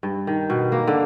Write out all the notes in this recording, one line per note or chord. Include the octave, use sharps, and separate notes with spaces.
G2
D#3
B2
A#3
D3